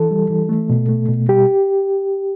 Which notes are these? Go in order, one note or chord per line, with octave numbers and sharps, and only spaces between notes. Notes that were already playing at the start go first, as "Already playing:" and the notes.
Already playing: E3 A4
G3
E3
A3
B2
A3
B2
G3 G4